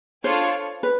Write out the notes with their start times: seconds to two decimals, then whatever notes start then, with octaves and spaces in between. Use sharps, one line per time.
0.24 D4 F4 A4 C5 C#5
0.83 B4